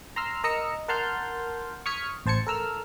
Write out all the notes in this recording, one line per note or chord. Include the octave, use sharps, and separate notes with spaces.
A#5 C6 E6 F6
A#4 D#5 A#5 E6 C#7
A#4 F#5 A5 C6 F6 G6
C#6 D#6 F6 G#6 B6 C#7
A1 C5 A5 G#6 C#7
A4 A#4 E6 F6